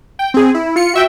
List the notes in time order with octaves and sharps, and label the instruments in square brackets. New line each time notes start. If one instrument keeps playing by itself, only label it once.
[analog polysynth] G5
C4 G#4
E4
F4 C#7
F#4 E5 G5